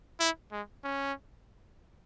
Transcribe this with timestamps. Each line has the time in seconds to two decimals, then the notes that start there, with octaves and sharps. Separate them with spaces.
0.20 E4
0.52 G#3
0.84 C#4